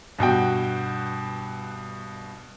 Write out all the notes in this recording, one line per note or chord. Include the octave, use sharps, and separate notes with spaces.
G2 B2 F#4 G5